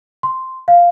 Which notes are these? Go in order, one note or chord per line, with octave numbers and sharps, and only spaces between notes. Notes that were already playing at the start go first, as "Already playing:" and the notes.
C6
F5